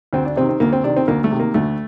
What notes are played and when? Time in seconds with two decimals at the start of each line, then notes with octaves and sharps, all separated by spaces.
0.13 D2 C4
0.25 D4
0.36 C3 C4
0.41 D#3
0.49 C4
0.60 D2 A#3
0.73 C4
0.83 C3 D4
0.87 D#3
0.96 C4
1.08 D2 A#3
1.24 A3
1.31 C3 D#3
1.40 A#3
1.54 D2 A3